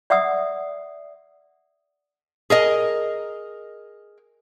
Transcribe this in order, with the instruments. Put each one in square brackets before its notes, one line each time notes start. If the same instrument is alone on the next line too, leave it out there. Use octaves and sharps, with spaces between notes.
[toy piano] D5 E5 F#5 D#6 E6
[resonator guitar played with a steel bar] G#4 A#4 D#5